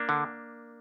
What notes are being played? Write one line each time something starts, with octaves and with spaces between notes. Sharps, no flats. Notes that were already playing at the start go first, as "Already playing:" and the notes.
Already playing: A#3 D4
D3